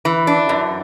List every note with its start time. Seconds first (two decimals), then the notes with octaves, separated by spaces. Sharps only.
0.05 E3
0.27 D4
0.49 F#2